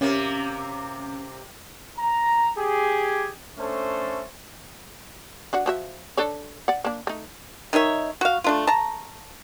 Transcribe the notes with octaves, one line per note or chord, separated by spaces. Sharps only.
C3 A#3 C#4
A#5
G4 G#4
A3 C#4 D4 A4 C5
D4 F#4 F#5
F3 F#4 E5
D4 A4 C#5
D5 F#5
A#3 D4
A3 D#4
D#3 D#4 C#5 E5
F#4 F5
A3 D4 F4
A5 A#5